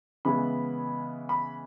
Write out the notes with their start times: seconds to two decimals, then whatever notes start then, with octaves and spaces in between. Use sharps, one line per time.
0.25 C#3 E3 G#3 B3 B5
1.29 B5